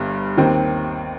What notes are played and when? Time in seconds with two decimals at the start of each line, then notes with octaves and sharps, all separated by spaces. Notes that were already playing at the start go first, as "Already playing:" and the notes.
Already playing: G1 G2
0.37 D#2 D#3 C4